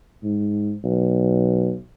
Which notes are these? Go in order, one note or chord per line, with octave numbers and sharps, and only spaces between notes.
G#2
B1